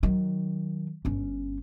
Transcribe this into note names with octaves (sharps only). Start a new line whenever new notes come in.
D#3 F#3
G1 C#4